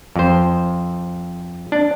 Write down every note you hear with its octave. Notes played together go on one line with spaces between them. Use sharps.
F2 C5
D4